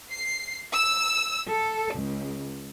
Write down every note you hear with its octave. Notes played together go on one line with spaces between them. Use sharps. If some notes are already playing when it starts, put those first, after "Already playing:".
C7
E6
A4
C#2